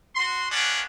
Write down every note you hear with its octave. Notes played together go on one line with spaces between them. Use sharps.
F#4 C6
A#3 B3 C#4 D4